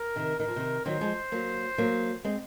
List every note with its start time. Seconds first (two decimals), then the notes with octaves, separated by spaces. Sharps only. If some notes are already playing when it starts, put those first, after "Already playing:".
Already playing: A#4
0.16 C3 D#3
0.39 D#3 A#4
0.48 F3
0.56 C3 D#3
0.86 D#3 F#3 C5
1.01 F3 G#3
1.32 F#3 A#3
1.78 F#3 A#3
2.24 G#3 C4